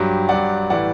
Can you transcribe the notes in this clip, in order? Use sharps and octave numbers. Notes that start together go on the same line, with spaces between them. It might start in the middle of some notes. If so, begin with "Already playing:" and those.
Already playing: G2 F#3 G4
G2 F#3 D5 F#5
A2 E3 G3 D5 F#5